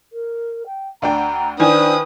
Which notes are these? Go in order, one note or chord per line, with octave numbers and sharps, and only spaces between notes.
A#4
G5
D2 D4 G5 A#5
D#3 D4 E4 B4 C5 G#5 D#6